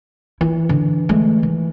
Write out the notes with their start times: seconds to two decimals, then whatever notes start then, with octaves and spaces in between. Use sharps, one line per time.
0.41 E3 E4
0.69 D3
1.09 G#3 A3
1.43 D#3